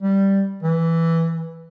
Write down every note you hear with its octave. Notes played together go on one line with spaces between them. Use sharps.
G3
E3